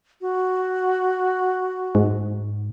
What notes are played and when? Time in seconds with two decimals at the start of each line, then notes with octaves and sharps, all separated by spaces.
0.21 F#4
1.95 G#2